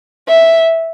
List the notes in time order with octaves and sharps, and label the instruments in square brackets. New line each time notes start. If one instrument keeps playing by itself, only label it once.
[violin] E5